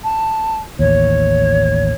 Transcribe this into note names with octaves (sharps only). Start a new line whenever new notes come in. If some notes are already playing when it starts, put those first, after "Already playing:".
A5
A1 D#2 C#5